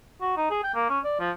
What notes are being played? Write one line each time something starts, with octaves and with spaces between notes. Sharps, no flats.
F#4
D#4
G#4
G5
A#3
C#4
D5
F3